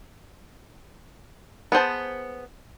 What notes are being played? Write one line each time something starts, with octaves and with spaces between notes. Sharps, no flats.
B3 G#4 C5 A5